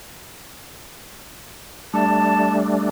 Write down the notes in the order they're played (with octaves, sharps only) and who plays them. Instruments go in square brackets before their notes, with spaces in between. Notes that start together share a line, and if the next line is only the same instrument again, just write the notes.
[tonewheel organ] G3 A3 D4 [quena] A5